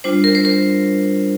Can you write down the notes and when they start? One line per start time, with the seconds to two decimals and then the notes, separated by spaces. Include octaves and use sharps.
0.04 G3 D4 F4 C5
0.24 A#4
0.35 C5
0.45 A#4